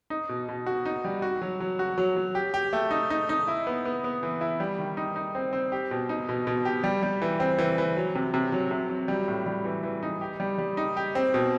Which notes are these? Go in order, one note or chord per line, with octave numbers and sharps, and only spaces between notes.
D#4
B2
B2
F#4
D#4
G3
F#4
F#3
F#3
F#4
F#3
F#3
G4
G4
A3
D#4
D#4
D#4
E4
B3
B3
B3
E3
E4
G3
D#3
D#4
D#4
C4
C4
G4
B2
D#4
B2
B2
G4
G3
G3
E3
C4
E3
E3
F#3
C3
C3
F#3
C3
F#3
G3
A2
G3
E3
E3
D#4
G4
G3
G3
D#4
G4
C4
B2